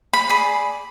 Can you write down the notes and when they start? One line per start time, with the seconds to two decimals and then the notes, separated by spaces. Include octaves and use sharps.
0.13 B5
0.29 G#4 D5 B5